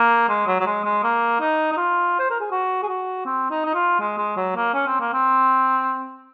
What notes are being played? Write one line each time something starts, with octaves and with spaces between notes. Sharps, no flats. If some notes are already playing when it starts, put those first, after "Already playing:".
Already playing: A#3
G#3
F#3
F#3
G#3
G#3
A#3
D#4
D#4
F4
C5
A#4
G#4
F#4
G#4
F#4
C4
D#4
D#4
F4
G#3
G#3
F#3
A#3
C#4
C4
A#3
C4